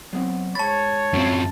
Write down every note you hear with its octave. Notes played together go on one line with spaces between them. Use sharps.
F#3 B3 C4
G#2 C#5 A5 B5 A6
F#2 C4